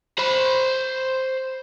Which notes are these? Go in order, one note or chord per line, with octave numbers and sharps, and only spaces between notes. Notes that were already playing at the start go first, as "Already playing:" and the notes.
C5 B5